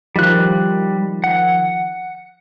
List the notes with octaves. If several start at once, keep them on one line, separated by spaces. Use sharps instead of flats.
D#3 F3 G3 F#6
F#5